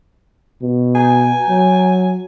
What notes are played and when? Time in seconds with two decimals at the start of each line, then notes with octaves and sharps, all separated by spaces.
0.62 B2
0.95 G#5
1.49 F#3